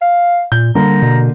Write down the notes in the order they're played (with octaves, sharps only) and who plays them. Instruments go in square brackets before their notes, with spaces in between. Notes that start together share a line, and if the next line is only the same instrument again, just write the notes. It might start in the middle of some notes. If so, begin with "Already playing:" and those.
[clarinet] F5
[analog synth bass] A#2 [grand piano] G6
[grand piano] D3 A#3 A#4 [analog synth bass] G3 [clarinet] A#5
[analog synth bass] B2